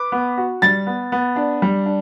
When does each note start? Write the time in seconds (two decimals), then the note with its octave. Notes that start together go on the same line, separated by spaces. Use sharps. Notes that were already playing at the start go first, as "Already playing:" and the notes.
Already playing: B4 D6
0.12 B3
0.37 F#4
0.62 G3 A6
0.87 B3
1.12 B3
1.36 D4
1.62 G3
1.86 D4